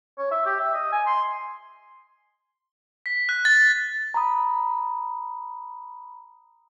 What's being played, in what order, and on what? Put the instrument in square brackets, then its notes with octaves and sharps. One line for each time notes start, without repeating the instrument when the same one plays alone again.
[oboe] C#5
E5
G4
E5
D#5
G#5
C6
[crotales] B6
F#6
A6
[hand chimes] A#5 B5 D#6